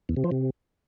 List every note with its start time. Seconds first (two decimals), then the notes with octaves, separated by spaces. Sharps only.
0.09 E2
0.17 C3
0.24 F3
0.32 C3